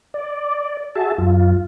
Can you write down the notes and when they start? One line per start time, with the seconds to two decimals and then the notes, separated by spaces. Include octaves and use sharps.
0.14 D5
0.95 F#4 G#4 E5 A5
1.18 F#2 F4